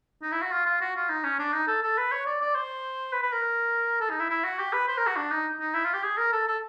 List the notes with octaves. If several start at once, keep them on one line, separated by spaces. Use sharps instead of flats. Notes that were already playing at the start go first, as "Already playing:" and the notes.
D#4
E4
F#4
F4
F4
F#4
F4
D#4
C#4
D4
D#4
A4
A4
B4
C#5
D5
D5
C5
B4
B4
A#4
A4
D#4
E4
E4
F#4
G4
B4
C5
A#4
F#4
D4
D#4
D#4
E4
F4
G4
G#4
A#4
A4
A4